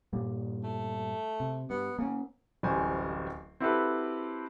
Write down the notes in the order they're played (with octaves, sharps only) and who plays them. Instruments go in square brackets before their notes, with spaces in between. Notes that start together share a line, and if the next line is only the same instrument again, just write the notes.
[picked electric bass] G2 A#2 G3
[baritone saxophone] A3
[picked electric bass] C3
[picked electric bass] G2 [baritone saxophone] B3
[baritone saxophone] C#3 [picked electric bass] A#3 C#4
[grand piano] D1 A1 G3 C5 G#5 C#6
C4 E4 F#4 G4 A4 B4